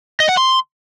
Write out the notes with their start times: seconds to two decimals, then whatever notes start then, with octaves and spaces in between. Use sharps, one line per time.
0.20 D#5
0.29 F#5
0.37 C6